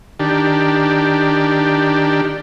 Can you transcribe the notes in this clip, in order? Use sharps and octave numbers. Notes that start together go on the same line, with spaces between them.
D#3 D4 G4